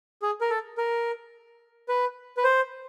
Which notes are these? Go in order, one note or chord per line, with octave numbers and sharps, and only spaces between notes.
G#4
A#4
A4
A#4
B4
B4
C5